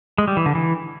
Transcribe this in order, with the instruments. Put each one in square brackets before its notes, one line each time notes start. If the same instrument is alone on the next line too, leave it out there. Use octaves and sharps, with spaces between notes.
[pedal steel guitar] G#3
G3
E3
D3
E3